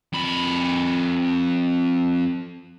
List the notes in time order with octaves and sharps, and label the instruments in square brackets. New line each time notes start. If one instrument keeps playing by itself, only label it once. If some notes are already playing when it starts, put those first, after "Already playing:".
[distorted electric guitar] F2 B5